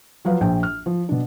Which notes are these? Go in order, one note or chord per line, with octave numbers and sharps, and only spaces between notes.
F3 F#3 B4 F5
A#1 G5
F6
F3
B2 D4